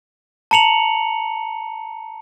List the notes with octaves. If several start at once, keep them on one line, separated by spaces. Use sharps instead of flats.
A5 A#5 C#7 F7 F#7